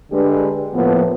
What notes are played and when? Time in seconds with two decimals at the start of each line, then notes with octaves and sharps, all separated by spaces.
0.12 D3 G#3 D4 G4 B4
0.74 A2 F3 A#3 B3